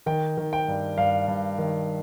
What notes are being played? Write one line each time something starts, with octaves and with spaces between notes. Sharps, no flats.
D#3 G5
D#3
G5
G2
G2 F5
G2
D#3